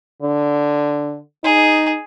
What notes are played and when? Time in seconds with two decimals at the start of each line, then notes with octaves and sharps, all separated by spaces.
0.22 D3
1.44 D#4 G#4